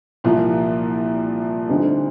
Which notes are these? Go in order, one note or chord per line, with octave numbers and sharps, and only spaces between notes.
C2 A#2 F3 A#3
D2 D3 G3 C4 D#4